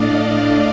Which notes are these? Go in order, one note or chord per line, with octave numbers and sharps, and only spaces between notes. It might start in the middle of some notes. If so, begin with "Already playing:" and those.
Already playing: A2 A3 D4 D5 D#5 F5